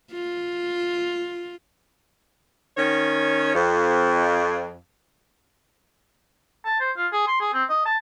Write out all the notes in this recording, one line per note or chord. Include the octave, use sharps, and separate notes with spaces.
F4
D#3 C#4 C#5
F2
A5
C5
F4
G#4
C6
G#4
C4
D#5
A5